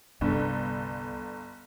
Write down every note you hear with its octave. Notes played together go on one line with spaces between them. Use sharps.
G1 C2 G2 D4 A4